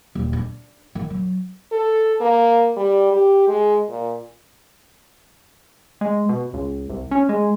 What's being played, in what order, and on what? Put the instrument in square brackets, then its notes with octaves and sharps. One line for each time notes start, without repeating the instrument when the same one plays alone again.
[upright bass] D#1
D4
D#3
F#3
[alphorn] A4
A#3
G3
G4
G#3
A#2
[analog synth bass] G#3
B2
C#2
C2
C#4
G#3